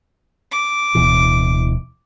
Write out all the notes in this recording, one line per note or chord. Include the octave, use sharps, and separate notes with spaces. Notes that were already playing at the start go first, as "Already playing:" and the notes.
D6
D1 B2 E3